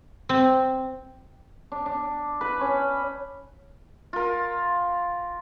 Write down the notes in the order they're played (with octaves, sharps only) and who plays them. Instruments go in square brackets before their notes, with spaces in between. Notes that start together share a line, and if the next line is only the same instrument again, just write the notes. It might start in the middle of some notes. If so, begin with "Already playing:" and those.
[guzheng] C4
[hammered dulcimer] D4
D4
B4
C#4
F4 A#4